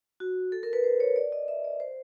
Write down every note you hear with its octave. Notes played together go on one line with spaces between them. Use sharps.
F#4
A4
A#4
B4
C5
C#5
D5
D#5
E5
D5
C5